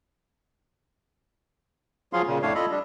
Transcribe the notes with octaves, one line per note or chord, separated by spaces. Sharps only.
F3 F#3 F4 G#4 F5 C6
A#2 C#3
F2 A2 A3 D4 C#5 F5
F4 A4 D#5 B5
G3 D4